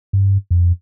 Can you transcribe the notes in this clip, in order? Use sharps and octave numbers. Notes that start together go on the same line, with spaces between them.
G2
F2